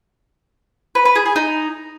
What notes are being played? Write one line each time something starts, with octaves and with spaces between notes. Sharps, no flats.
B4
B4
G#4
G#4
D#4